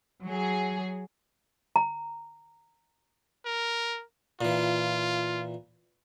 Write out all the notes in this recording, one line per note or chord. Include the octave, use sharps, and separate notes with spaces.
F#3 G#4
A#5
A#4
A#2 E3 F4